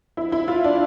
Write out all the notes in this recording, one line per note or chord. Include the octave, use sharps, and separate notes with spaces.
E4
E4
F4
D4